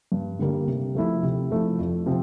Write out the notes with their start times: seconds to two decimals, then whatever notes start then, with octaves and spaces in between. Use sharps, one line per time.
0.12 G2
0.39 D3 G3 A#3
0.67 C3
0.95 F3 A3 E4
1.23 C3
1.51 F3 A3 E4
1.79 F2
2.06 C3 F3 C4